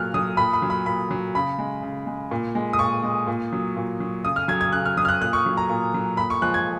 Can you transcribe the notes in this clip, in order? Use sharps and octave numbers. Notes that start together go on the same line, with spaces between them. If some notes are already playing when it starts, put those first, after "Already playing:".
Already playing: A#2 F#3 F6 F#6
F#3 D#6
A#2 B5
B5
F#3
B5
A#2 B5
F#3
C#3 B5
G#3
C#3
G#3
A#2
G#3
D#6
A#2 C#6
G#3
A#2
F#3
A#2
F#3
C#3 D#6
F6
F#3 G#6
G#6
C#3 F#6
F6
F#3 D#6
F6
F#6
A#2 F#6
C#6
F#3
A#5
A#2
F#3
A#2 B5
C#6
F3 G#3 F#6
G#6